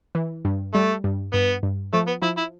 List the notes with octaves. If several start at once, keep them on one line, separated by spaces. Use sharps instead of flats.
E3
G2
G3 A3
G2
G2 B3
G2
F3 A3
B3
F3 E4
E4